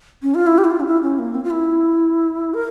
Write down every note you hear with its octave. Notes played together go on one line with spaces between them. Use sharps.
C#4
F4
E4
G4
E4
F4
C#4
E4
C#4
A#3
C4
F4
E4
A#4